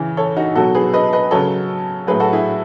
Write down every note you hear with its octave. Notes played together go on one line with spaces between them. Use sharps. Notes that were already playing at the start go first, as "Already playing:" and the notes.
Already playing: C#3 E3
A4 C#5
D#4 F#4
B2 F#3 F#4 A4
G#4 B4
B4 D#5
B4 D#5
C#3 F#3 A4 C#5
A2 F#3 G#4 B4
F#4 A4
E4 G#4